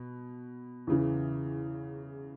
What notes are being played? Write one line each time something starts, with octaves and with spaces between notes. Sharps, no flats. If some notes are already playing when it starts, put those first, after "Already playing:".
Already playing: B2
E2 C#3 E3